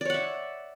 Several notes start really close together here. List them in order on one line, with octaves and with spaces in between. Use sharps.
D5 C#5 F#5 E5